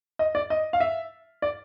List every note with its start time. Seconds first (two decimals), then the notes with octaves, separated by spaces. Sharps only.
0.19 D#5
0.35 D5
0.50 D#5
0.73 F5
0.80 E5
1.42 D5